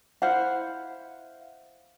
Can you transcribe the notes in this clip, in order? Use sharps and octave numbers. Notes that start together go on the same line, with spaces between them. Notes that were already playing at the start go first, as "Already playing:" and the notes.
E4 C5 F5 F#5